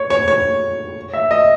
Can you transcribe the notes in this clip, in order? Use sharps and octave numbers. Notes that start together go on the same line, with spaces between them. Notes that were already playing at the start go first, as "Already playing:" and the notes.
Already playing: C#5
C#5
C#5
E5
D#5